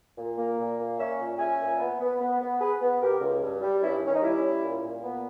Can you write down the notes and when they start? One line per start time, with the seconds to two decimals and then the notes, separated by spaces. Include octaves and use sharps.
0.18 A#2
0.38 A#3
0.59 A#2
0.79 A#3
0.98 C#4 C#5 E5
1.19 A#2
1.39 C#4 E5 G#5
1.59 A#2
1.79 B3
2.00 B3
2.21 B3
2.40 B3
2.60 B3 G#4 B4
2.81 B3
3.01 B2 G4 A#4
3.20 C#2
3.42 G2
3.61 G3
3.82 G2 C#4 E4
4.02 D#3 C#4
4.13 D#4
4.22 G3 C#4 E4
4.42 C#4
4.63 A#2
4.82 A#2
5.03 B3